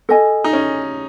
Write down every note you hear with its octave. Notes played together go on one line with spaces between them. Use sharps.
A4 D#5 G#5
D#4
C#4